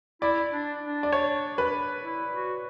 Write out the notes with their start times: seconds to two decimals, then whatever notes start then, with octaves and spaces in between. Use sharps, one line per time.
0.22 E4 D5
0.52 D4
0.82 D4
1.03 D5
1.12 C#5
1.58 B4
2.03 E4
2.33 F#4